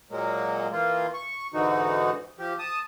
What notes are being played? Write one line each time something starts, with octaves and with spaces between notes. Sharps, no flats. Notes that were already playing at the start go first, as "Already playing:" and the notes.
A#2 F#3 G#3 A#3
E3 A#3 F4
C#6
G#2 D3 E3 D#4 F#4
F3 G4
A5 D#6